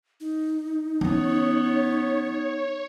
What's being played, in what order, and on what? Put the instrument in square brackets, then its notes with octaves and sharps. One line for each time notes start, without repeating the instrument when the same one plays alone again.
[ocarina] D#4
[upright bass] E3 C#4 [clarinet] B3 [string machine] C#5